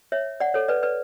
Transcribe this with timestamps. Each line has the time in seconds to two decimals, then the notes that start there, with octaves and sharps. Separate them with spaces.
0.12 C#5 E5
0.40 D5 F#5
0.54 A4 C#5
0.68 B4 D5
0.83 B4 D5